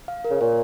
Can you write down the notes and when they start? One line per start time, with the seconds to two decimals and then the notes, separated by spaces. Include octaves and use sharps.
0.08 F5
0.25 A#4
0.30 C#3
0.41 A#2 C#5